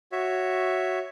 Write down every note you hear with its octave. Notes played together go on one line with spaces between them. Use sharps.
F#4 C#5 E5